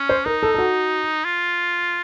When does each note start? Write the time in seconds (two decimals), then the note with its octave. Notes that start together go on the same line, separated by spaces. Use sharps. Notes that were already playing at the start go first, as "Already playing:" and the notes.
Already playing: C#4
0.09 C5
0.26 D#4 A#4
0.43 A4
0.54 A4
0.58 F#4
1.25 F4